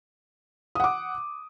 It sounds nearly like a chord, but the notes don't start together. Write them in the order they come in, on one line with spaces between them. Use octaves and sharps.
D#6 F#5 D6